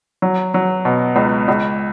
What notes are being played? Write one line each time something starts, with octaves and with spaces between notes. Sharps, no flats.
F#3
F#3
B2
C#2
C#2